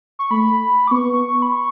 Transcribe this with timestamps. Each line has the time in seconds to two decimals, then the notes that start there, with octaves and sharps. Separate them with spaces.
0.19 C#6
0.31 A3 B5
0.88 D6
0.91 B3 C#6
1.42 B5
1.52 C#6